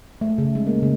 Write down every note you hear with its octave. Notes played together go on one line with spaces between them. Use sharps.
A3
C#3
G#3
A#3
C#3